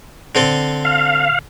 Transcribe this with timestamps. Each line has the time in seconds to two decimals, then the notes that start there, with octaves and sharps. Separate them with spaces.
0.35 D3 C4 A4
0.85 F5